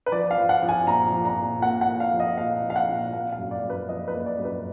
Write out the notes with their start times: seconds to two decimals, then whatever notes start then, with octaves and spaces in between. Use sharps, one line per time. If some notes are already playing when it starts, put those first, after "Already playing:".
0.06 B4
0.12 F3 D5
0.31 F5
0.37 F3
0.49 F#5
0.62 F3
0.69 G#5
0.87 A#2 A#5
1.12 F3
1.25 A#5
1.38 A#2
1.62 A#3 F#5
1.81 F#5
1.88 A#3
2.00 F5
2.13 F3
2.20 D#5
2.38 A#2 F5
2.63 F3
2.70 F5
2.76 F#5
2.89 A#2
3.13 A#3 F5
3.32 F5
3.38 F#2
3.51 D5
3.63 F#2
3.70 B4
3.89 F3 D#5
4.08 B4
4.14 A#3
4.26 D5
4.39 F#2
4.45 B4